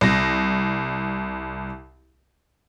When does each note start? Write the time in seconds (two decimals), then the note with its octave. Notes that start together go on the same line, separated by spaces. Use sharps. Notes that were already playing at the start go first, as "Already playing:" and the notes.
0.01 C2 A#6